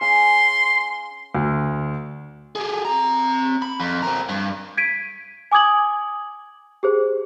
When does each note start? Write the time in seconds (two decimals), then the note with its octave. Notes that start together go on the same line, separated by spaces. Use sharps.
0.01 C#4 G#4 F5 C6
1.35 D2
2.56 G4 G#4
2.85 C4 A#5
3.62 B5
3.80 F2
4.02 C4 A#4
4.29 G2
4.77 G#6 B6 D7 D#7
5.52 G#5 D6 D#6 G#6 F#7
6.83 G4 G#4 C5